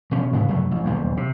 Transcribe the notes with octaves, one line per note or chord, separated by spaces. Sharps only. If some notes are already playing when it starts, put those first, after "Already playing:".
B2 F3 C#4
G#2 C#3 B3
F1 F#2 F#3 A3
A1
D#1 B1 E2
C3